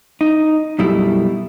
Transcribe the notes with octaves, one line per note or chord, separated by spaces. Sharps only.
D#4
F#2 B2 G3 A3 E4